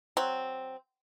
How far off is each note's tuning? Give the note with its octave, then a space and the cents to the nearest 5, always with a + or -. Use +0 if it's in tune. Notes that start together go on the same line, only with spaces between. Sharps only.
F#3 +0 C4 +0